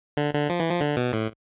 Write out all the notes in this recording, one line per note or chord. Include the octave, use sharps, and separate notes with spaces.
D3
D3
F3
E3
F3
D3
B2
A2